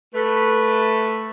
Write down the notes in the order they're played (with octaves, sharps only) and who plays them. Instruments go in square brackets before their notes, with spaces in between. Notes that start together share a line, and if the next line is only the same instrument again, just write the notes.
[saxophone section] A3 [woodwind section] B4